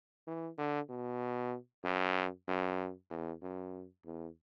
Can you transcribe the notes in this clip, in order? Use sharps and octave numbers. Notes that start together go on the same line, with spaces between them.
E3
D3
B2
F#2
F#2
E2
F#2
E2